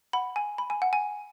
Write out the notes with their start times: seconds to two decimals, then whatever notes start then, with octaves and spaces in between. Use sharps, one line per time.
0.13 F#5 B5
0.36 G#5
0.58 B5
0.70 G#5
0.82 F#5
0.93 G#5